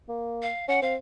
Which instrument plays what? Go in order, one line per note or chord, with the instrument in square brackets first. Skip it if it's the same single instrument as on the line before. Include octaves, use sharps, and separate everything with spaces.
[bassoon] A#3
[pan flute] F5
[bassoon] C#4 [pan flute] F#5
[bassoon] C4 [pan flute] F5